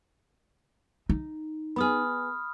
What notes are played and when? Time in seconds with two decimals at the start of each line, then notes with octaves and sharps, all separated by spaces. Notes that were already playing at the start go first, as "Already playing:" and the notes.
1.09 D#4
1.76 B3 G#4 B5 D#6 F6